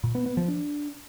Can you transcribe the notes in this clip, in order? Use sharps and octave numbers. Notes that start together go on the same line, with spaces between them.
A#2
B3
B3
F3
D4